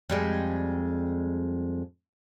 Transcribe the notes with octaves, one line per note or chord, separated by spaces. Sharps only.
F2 G3 G#3